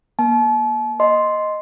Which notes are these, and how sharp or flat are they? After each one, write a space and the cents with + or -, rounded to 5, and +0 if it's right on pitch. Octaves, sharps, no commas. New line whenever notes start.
A#3 +40 A5 -40
D#5 +0 C6 +0